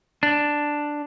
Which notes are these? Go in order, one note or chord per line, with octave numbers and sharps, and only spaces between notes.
D4